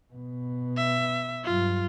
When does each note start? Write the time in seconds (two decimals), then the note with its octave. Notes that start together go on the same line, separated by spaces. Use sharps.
0.14 B2 B3
0.77 E5
1.45 G2 F#3 F4